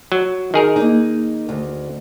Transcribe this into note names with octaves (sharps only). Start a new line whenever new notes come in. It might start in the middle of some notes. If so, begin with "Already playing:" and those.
F#3
D#3 G#4 A#4
A#3 D#4
D2